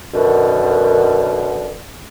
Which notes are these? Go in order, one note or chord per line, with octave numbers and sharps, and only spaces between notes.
F#2 B2 D3 D#3